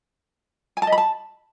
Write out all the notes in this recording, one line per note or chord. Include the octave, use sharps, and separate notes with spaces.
G#5
A5
D#5
B5
A5